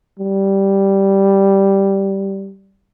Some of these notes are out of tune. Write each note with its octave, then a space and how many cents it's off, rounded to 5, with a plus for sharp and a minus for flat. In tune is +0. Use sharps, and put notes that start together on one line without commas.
G3 -5